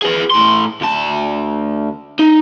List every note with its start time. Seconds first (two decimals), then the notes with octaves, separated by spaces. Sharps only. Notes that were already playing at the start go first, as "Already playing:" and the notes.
0.02 G#4 B4
0.30 A2 C6
0.81 D2 A5
2.19 D#4